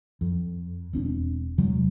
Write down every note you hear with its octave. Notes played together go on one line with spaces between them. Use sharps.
F2
E1 C4 D4
E2 C3 F#3 G#3